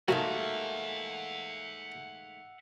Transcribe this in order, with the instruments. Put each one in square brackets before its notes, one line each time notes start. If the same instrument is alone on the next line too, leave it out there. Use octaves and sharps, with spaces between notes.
[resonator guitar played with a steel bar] G#2 A3 A#3 [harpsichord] F#3 [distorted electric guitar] E5 F#5